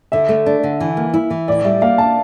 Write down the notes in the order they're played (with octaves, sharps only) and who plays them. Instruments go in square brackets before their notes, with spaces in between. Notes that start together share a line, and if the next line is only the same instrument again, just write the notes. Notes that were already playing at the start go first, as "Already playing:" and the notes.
[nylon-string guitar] D3 [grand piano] E5
[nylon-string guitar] A3
D4
D3
E3
A#3
E4
E3
[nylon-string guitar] A2 [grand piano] D5
[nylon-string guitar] G3 [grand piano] E5
[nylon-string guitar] A#3 [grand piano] F5
[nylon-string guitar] D4 [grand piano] A5